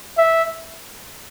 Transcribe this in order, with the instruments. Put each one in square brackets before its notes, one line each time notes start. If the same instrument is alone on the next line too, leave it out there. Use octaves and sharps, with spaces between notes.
[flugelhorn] E5